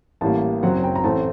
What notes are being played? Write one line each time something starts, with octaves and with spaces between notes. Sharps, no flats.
A1 A2 G3 A#3 A5
F#1 F#2 F#3 C4 F#5
G5
A#5
A1 A2 A3 C4 A5